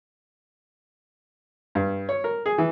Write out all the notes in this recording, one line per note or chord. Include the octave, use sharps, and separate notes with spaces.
G2
C#5
A#4
G#4
E3